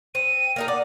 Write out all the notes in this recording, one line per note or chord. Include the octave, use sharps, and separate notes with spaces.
C4 D#7
A#3 D#4 A#4
D5 F#5